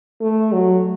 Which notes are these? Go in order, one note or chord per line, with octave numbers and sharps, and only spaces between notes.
A3
F#3